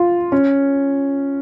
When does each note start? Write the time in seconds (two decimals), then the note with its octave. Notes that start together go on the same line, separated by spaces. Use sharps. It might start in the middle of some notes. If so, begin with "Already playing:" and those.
Already playing: F4
0.32 C#4